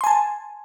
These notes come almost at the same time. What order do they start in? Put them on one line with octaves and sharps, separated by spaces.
C6 G#5 A5